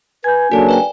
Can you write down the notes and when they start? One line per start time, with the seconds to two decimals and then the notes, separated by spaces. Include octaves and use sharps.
0.24 B4 G#5 G6 G#6
0.51 C#3 F#3 A#3 D4 F#4 A4 G#5
0.69 B4 D5 G5